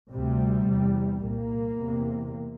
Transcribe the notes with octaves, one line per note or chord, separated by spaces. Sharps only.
D2 C3 G3
E2 C3
C2 A#2 A#3
E2 C3